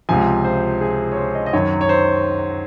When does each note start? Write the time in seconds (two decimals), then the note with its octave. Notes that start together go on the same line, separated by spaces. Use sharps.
0.09 C#2 C3 F3 G#5
0.44 C5
0.81 G#4
1.12 C#5
1.17 C5
1.35 D#5
1.46 D#5
1.53 F#2 D#3 F#3 C#5
1.81 C#5
1.89 C5